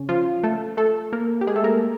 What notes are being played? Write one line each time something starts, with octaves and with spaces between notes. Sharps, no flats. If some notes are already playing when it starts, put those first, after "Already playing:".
Already playing: C#3 C#4
F3 F4
A3 A4
A3 A4
A#3 A#4
G4
G#3 G#4
A3 A4
A#3 A#4